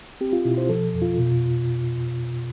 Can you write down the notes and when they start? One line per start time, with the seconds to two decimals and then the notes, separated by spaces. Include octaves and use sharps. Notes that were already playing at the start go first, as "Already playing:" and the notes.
0.21 C4 G4
0.33 F4
0.45 B2 E4
0.58 C5
0.69 F3 A4
0.94 F2
1.02 F4
1.18 B2